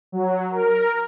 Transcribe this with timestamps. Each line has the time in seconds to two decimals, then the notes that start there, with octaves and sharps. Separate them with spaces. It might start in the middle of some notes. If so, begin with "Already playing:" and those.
0.12 F#3
0.51 A#4